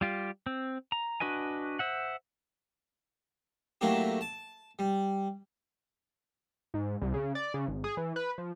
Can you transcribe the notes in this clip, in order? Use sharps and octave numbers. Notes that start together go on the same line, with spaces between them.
G3 F4 G4
C4
A#5
D4 F#4 B4 D#5 G#5
C5 E5 F#5
F#3 A3 A#3 D4 E4 G4
A5
G3
G#2
C2
C#3
D5
C#3
G#1
G#4
E3
B4
F3